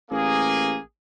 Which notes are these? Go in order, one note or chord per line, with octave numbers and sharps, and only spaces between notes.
A1 A#3 G#4